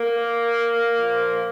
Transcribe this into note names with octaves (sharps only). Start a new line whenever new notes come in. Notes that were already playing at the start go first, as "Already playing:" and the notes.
Already playing: A#3
A#2 F3